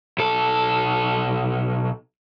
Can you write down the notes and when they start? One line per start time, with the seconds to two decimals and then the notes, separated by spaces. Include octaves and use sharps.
0.18 B1 A4